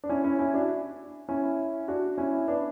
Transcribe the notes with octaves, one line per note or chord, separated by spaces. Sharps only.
D4
C#4 E4
C#4 E4
C#4 E4
D4 F#4
C#4 E4
D4 F#4
C#4 E4
B3 D4